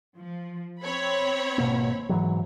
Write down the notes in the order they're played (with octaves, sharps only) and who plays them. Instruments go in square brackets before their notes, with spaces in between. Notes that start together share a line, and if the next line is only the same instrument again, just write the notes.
[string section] F3
C4 C#5 B5
[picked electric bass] G#1 B2 A#3
G#2 E3 F#3